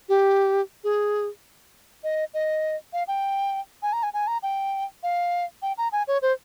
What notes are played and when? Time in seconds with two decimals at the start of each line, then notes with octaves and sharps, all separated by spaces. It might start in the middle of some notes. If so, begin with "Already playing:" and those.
0.09 G4
0.84 G#4
2.03 D#5
2.34 D#5
2.93 F5
3.08 G5
3.82 G#5
3.93 A#5
4.03 G#5
4.13 G#5
4.27 A#5
4.43 G5
5.03 F5
5.62 G5
5.78 A#5
5.92 G#5
6.07 C#5
6.22 C5